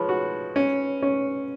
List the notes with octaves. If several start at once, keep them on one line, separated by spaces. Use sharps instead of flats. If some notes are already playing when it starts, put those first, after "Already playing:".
Already playing: F3 G#3 B4 C#5
F#4
C#4
C#4